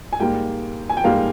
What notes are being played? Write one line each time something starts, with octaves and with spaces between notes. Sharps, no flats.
G#5
G#2 G3 A#3 G5
G#5
G5
G#2 G3 A#3 F5